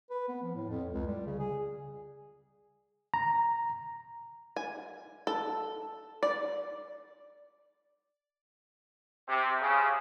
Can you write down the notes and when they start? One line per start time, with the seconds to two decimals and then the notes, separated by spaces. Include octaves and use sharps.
0.10 B4
0.29 B3
0.43 F3
0.55 A2
0.70 F2
0.92 C#2
1.07 G3
1.27 C#3
1.39 G#4
3.14 A#5
4.56 G#5
5.27 A4
6.23 D5
9.28 C3
9.61 C#3